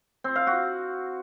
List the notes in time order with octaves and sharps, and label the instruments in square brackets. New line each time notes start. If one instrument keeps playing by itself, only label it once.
[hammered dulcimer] C4
F5
F#4